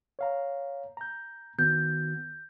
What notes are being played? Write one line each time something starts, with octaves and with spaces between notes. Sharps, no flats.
C#5 F5 A#5
A#5 G6
D#3 B3 F#4 G6